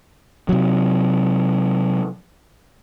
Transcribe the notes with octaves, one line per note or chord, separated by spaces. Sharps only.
C3 F#3